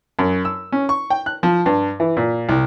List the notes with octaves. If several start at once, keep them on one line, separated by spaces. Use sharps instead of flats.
F#2
E6
C#4
C#6
G5
F#6
F3
G2
E3
A#2
C2